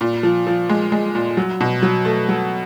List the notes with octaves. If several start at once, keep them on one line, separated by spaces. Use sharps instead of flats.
A#2
F3
F3
G#3
G#3
A#2
F#3
B2
F#3
A3
F#3